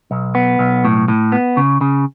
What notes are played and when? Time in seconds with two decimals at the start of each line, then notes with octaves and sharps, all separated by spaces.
0.11 B1
0.35 B3
0.59 B1
0.85 A2
1.08 A2
1.32 B3
1.57 C#3
1.81 C#3